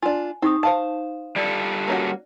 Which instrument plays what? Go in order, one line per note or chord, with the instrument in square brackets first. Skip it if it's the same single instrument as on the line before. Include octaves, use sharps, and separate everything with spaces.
[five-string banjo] D4 F4 [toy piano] G#5
[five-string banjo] C4 [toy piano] D#4 G4 D#6
[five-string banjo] C5 F5 A5
[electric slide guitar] G3 F4 A4 [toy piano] D5
[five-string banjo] A#3 C#4 F#4